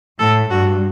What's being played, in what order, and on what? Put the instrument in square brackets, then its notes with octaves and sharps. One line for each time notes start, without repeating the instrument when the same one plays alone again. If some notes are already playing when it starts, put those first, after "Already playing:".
[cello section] A2 [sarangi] A4
[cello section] G2 [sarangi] F#4